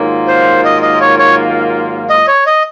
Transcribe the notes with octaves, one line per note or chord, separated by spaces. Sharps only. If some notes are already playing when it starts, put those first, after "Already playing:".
Already playing: G#2 D#3 F#3 A#3 F4
C5
D#5
D#5
C#5
C#5
D#5
C#5
D#5